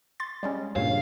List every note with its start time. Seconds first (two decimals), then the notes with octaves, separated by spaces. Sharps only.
0.20 C6 A6
0.43 G3 G#3 C#4
0.76 G2 A#2 C#3 C#5 F5